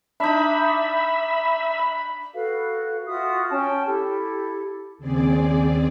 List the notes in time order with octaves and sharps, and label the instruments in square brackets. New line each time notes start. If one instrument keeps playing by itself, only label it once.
[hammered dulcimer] D4 D#4 [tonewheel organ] E5 [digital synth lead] B5
[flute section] F#4 A4 B4 F5
F4 F#4 E5 D#6
C#4 G5 A5
E4 G4 A4
[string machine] D#2 C#3 C4 G#4 D5